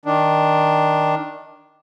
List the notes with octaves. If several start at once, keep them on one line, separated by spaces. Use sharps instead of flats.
D#3 D4